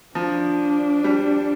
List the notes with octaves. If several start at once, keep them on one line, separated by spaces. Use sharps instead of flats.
F3 D4
G3